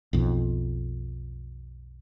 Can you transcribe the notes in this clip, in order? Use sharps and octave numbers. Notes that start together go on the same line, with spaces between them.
B1 F2